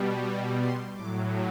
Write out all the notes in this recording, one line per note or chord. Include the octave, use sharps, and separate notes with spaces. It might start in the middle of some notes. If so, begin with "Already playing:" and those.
Already playing: B2 G3
C6
A2 F#3 D6